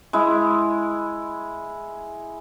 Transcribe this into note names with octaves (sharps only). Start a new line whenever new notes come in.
G#3 E4